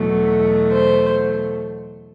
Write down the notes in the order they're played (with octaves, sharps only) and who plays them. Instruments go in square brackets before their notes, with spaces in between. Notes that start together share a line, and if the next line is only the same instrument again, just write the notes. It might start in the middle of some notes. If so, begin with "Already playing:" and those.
Already playing: [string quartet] E2 B2 F#3 A3
C5